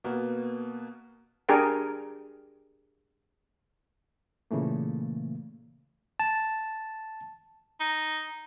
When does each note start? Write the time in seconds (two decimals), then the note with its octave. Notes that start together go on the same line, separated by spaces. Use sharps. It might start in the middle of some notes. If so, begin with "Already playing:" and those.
0.04 B2 A#3 B3
1.49 D4 G4 G#4 A#4 G5 G#5
4.51 A#2 C#3 E3 A3 A#3
6.20 A5
7.80 D#4